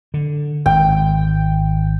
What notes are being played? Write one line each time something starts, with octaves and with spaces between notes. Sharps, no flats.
D3
G#1 G5